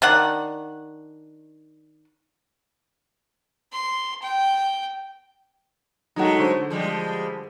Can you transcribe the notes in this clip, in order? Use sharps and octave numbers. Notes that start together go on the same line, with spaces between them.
D#3 D4 F#5
C6
G5
F#3 G#3 A3 D#4 F#4
D3 C5 C#6
F3 G3 G#3